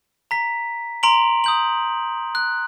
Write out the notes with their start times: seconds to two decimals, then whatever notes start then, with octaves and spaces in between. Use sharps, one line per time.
0.31 A#5 B6
1.03 A#5 C6 D7 F7 F#7
1.44 D#6 G6 F#7
2.35 F#6